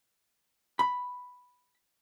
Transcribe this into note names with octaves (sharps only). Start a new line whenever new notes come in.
B5